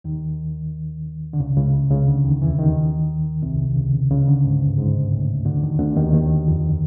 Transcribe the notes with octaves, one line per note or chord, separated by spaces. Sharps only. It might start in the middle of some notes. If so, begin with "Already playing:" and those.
D#2 D#3
D3
C#2 C#3
C#2 C#3
C#2 C#3
D2 D3
D#2 D#3
E2 E3
D#2 D#3
C2 C3
C#2 C#3
C#2 C#3
D2 D3
G#2
G2
G#2
A2
D2 D3
D#2 D#3
D2 D3
D#2 D#3
D#2 D#3
F2 F3